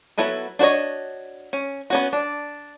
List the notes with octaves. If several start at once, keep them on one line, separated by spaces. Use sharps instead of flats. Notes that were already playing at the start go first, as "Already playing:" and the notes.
F#3 B3 E4 A4 B4
D4 F#4 C5 C#5 D#5
C#4
B3 C#4 F#4
D4